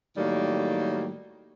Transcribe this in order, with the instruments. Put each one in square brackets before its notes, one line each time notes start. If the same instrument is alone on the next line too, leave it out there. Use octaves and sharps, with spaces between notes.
[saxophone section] A2 D#3 F#3 G3 A#3